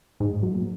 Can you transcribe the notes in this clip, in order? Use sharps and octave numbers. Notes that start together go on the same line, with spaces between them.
G#2
F#2
A#2